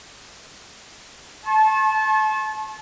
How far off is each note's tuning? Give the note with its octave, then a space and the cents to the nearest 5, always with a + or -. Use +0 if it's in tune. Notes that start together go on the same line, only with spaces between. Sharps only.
A5 -25 C#6 -45